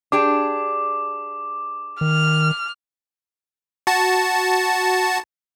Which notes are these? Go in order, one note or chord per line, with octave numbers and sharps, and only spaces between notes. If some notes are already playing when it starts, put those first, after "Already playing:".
D4 G4 G#4 D6
D#3 F6
F#4 A5